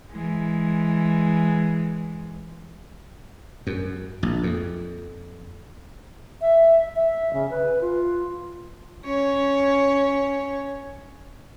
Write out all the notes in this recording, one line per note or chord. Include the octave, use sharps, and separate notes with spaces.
E3 G#3
F#2
A#1
F2
E5
E5
C#3
B4
F4
C#4 C#5